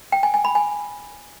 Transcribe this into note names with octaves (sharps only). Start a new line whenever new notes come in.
G5
G#5
G#5
B5
G#5